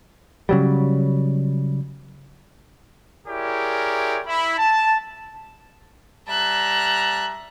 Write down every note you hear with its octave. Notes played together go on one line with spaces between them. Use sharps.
C#3 F#3 G3
E4 G4 G#4 A#4 C#5 D5
E4 B5
A5
G3 E5 A5 A#5 F#6